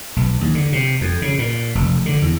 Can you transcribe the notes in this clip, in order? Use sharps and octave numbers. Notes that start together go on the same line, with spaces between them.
B1
D#2
D3
C3
F2
C#3
A#2
F1
D3
E2